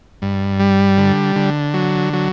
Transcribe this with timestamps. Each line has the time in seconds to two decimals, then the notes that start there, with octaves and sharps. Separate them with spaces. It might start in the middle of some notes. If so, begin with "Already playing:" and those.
0.22 G2
0.60 G3
0.98 D3
1.36 D3
1.74 F#3
2.13 F#3